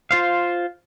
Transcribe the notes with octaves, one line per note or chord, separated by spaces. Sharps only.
F4 C5 F5